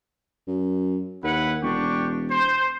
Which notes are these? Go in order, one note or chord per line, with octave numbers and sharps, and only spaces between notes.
F#2
D#2 E4 B4 F#5
E1 D4 G4 C#6
C5